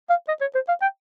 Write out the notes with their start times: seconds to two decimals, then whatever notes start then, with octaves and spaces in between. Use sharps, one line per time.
0.10 F5
0.28 D#5
0.41 C#5
0.55 C5
0.68 F5
0.82 G5